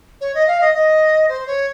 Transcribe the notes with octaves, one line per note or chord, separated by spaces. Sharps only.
C#5
D#5
F5
D#5
D#5
C5
C#5